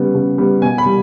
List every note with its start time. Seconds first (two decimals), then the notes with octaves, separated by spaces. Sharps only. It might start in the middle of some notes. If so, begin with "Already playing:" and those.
Already playing: C#3 G3 B3
0.15 C#3
0.38 G3 B3
0.62 B2 G#5
0.78 B5
0.86 G3